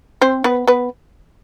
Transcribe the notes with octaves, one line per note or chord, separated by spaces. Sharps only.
C4 C5
B3 B4
B3 B4